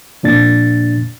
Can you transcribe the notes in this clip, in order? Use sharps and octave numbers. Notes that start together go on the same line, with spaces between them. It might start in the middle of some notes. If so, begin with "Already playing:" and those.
F2 A#2 D4 A6